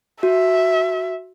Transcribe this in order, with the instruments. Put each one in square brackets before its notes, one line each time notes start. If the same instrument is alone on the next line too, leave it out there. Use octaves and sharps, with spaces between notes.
[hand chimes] F#4 [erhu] E5